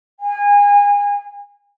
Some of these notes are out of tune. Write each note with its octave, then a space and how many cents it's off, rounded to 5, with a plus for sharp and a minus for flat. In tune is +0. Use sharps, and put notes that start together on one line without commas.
G#5 -30